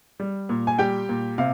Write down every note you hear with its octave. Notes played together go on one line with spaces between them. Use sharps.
G3
A#2
G#5
G3 G4 G5
A#2
C3 F5